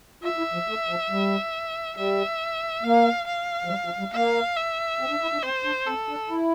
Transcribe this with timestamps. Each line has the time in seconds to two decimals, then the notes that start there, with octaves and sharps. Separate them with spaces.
0.24 F4 E5
0.38 E4
0.53 F3
0.68 A3
0.89 F3
1.10 G3
1.97 G3 E5
2.83 A#3 F5
3.27 F5
3.65 F3
3.70 G3
3.85 F3
3.99 G3
4.13 A#3 F5
4.56 E5
5.00 C4
5.10 D4
5.22 E4
5.33 D4
5.43 C4 C5
5.64 D4
5.87 C4 A4
6.09 D4
6.30 E4